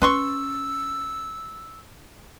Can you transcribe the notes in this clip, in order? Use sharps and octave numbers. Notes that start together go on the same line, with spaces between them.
C#4 B4 C6 C#6 E6